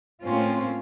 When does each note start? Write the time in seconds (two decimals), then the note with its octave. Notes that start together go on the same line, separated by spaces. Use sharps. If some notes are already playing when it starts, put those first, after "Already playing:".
0.23 A2 A#3 C4 C#4 F4